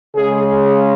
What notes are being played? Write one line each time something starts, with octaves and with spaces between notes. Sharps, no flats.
C#3 G#3 G#4